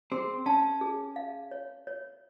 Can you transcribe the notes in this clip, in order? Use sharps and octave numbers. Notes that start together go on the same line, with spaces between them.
C4 G#4
C#4 A5
G#4
F5
C#5
C#5